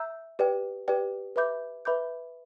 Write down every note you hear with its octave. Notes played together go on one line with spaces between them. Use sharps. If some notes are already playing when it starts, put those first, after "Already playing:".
Already playing: E5 A#5 E6 G6
G4 B4 D5 G5
G4 B4 D5 G5
B4 E5 B5 D6 G6
B4 E5 B5 D6 G6